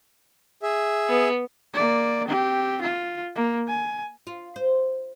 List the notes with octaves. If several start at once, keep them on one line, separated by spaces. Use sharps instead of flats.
G#4 E5
B3
A#3 D5
C4 G4
F4
A#3
G#5
F4
C5